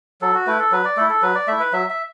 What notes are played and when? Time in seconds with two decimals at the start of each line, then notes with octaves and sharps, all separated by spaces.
0.22 F#3 A4
0.34 F#4
0.47 A3 E4 B4
0.59 A4
0.72 F#3 B4
0.85 D5
0.97 A3 E4 A4
1.10 A4
1.23 F#3 B4
1.35 D5
1.48 A3 E4 E5
1.60 B4
1.73 F#3 E5
1.90 E5